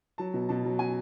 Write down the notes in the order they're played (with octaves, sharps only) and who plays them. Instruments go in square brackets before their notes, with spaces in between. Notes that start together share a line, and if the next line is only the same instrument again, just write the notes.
[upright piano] F#3 A5
B2
B2 A5
F#3
F#3 G#5